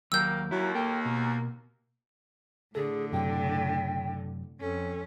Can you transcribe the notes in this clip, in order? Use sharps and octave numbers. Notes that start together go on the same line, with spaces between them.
D#2 F#3 G3 A#3 A#4 E6 G6
D#2 F#3 E4
A#3 A4 G5
B2
A2 D3 G#4 A4
F#2 C3 F#3 G5
F2 C#4 A4